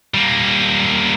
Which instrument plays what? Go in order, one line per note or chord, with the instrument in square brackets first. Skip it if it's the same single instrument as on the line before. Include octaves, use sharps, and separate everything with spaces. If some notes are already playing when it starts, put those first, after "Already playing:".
[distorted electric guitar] G3 A#3